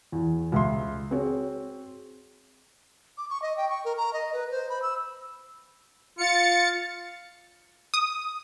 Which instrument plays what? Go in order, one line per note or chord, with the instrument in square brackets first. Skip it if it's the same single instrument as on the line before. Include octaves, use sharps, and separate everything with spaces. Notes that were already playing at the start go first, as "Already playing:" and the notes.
[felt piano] E2
C#2 E5 C6
C4 F#4 G#4 C#5
[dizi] D6
C#6
D#5
G5
C#6
A#4
A#5
D#5
B4
C5
B5
E6
[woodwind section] F4 [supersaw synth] A6 C#7
[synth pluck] D#6